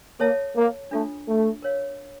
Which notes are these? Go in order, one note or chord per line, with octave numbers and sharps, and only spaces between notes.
A#3 A4 C#5 E5 A5
A#3
A3 D4 F4 A4
A3
A#4 C#5 F5